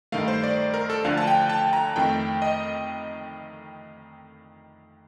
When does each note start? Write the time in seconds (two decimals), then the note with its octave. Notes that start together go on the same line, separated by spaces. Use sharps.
0.12 G2 D#3 A3 F5
0.28 C5
0.43 D5
0.74 A#4
0.90 A4
1.04 D2 D3 F3 A3 F5
1.17 A5
1.27 G5
1.49 A5
1.73 A#5
1.96 F2 D#3 A3 G5
2.42 D#5